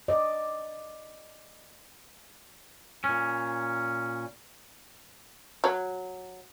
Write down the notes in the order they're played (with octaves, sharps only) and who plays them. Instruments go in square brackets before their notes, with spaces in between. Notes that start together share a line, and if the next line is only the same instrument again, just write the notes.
[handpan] D5 D#5
[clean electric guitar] A#2 C#4
[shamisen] F#3